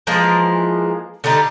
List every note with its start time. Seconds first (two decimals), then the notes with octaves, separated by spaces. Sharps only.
0.07 E3 F3 G#3 A#3
1.24 D3 G3 D4 D#4